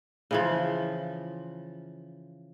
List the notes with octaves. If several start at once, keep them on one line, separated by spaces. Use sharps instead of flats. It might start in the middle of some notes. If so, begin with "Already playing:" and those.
C#3 E3 F3